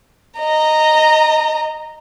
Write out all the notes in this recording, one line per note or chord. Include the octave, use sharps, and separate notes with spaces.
D#5 A#5